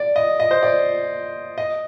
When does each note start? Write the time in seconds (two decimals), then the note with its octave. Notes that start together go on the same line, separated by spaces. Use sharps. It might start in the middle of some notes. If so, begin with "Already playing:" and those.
Already playing: D5
0.16 D#5
0.40 D#5
0.51 C5
0.63 D5
1.58 D#5